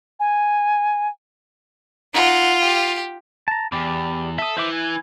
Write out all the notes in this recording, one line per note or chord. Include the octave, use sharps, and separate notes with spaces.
G#5
D#4 F4 F#5
G4
A5 A#5
E2 G4 D5 D6
A4 E5 D#6
E3 C5 E5 D6
G#5